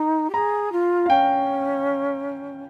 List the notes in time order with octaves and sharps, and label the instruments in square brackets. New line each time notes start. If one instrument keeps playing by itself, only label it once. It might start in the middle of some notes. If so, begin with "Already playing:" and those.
Already playing: [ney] D#4
G4
[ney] G#4 [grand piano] A#5
[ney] F4
[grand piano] F5
[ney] C#4 [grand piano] G5